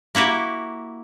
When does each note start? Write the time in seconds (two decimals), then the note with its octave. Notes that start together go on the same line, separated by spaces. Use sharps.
0.15 A#3 E4 F#4 G4